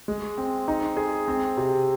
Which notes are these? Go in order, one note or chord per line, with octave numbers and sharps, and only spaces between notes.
G#3
C4
D#4
G#4
C4
C3